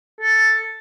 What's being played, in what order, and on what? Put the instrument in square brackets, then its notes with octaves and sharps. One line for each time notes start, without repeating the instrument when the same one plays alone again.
[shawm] A4